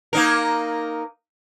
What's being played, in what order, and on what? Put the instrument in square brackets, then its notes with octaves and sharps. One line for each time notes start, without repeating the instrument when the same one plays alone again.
[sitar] A#3 D#4 A#4